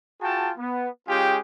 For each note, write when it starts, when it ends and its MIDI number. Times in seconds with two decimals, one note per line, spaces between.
0.21 0.51 65
0.21 0.51 66
0.21 0.51 68
0.21 0.51 79
0.21 0.51 81
0.58 0.88 59
1.08 1.38 56
1.08 1.38 61
1.08 1.38 65
1.08 1.38 67
1.08 1.38 68
1.08 1.38 79